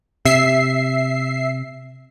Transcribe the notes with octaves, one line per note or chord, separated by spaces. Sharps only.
C3 E5 C7